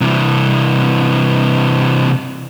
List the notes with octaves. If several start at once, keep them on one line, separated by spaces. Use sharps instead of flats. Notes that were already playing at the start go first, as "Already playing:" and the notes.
C3 E3